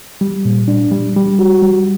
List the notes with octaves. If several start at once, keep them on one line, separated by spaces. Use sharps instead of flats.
G3
A#2
D4
G3
G3
F#4
G3